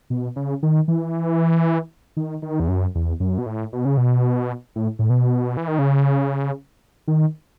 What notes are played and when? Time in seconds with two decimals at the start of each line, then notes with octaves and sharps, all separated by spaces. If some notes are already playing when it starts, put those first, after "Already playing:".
0.10 B2
0.36 C#3
0.63 D#3
0.88 E3
2.17 D#3
2.42 D#3
2.60 E2
2.68 F#2
2.95 E2
3.20 F#2
3.38 B2
3.46 A2
3.73 B2
3.85 C#3
3.97 B2
4.76 A2
4.99 A2
5.10 B2
5.57 E3
5.68 D#3
5.79 C#3
7.08 D#3